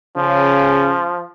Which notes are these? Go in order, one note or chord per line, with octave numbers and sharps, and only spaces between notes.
C#3 F3